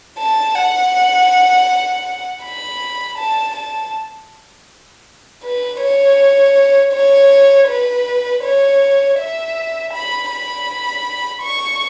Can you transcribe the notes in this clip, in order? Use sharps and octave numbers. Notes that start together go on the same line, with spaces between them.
A5
F#5
B5
A5
A5
B4
C#5
C#5
B4
C#5
E5
B5
B5
C#6